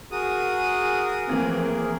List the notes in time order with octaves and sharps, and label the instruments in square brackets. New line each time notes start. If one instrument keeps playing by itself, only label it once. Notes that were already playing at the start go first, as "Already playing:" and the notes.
[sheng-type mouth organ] F#4 D#6 [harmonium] G#4 A#4
[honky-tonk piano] E3 A#3 [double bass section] F3 A3 C4